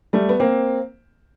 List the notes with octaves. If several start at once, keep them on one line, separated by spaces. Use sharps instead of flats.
G3 A3
B3
A#3 C4